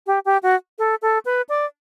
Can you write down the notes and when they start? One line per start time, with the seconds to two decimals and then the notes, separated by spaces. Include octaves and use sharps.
0.07 G4
0.25 G4
0.43 F#4
0.79 A4
1.02 A4
1.25 B4
1.49 D5